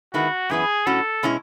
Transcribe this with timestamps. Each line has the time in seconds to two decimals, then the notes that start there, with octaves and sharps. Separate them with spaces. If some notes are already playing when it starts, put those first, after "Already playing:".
0.14 D#3 G#3 B3 E4 F#4
0.50 F#2 E3 B3 E4 G#4
0.86 A2 F#3 C#4 F#4 A4
1.23 B2 G#3 C#4 E4